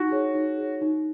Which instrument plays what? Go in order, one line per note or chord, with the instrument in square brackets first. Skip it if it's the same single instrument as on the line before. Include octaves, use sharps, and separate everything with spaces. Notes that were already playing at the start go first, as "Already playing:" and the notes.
Already playing: [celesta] D#4 [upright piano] F#4
[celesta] G#4 C#5
D#4
G#4 C#5
D#4